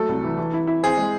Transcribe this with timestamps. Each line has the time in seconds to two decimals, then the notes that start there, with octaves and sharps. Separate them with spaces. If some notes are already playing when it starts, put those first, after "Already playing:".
Already playing: F#3 A3 A4
0.09 C2
0.24 E3
0.38 E3
0.53 E4
0.67 E4
0.83 C4 G#4
0.97 G#3